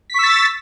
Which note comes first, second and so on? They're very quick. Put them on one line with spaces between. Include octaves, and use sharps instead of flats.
B6 C#6 E6 A6